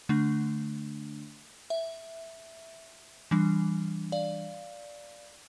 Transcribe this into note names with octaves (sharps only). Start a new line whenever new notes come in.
D3 A3 D4
E5
E3 G3 D4
D5 F5